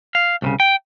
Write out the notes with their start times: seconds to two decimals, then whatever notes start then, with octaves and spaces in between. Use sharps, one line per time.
0.15 F5
0.42 C2 A#2 C#3
0.60 G5